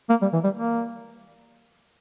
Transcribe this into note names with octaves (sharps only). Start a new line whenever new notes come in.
A#3
G3
E3
G3
A#3